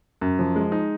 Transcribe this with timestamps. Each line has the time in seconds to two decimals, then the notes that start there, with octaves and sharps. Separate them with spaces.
0.21 F#2
0.39 F3
0.56 G#3
0.72 D#4